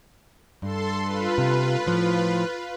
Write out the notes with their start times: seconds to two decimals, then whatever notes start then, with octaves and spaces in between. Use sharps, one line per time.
0.62 G2 A4 C6
1.04 F4 B4
1.38 C3
1.87 A2 F3